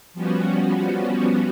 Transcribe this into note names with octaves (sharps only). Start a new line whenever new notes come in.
F3 G3 B3 C#4 F#4